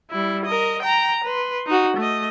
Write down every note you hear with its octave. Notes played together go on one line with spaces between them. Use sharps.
G3 E4
A#4 D#5
G5 A#5
B4 C6
D#4 F#4
A3 D#5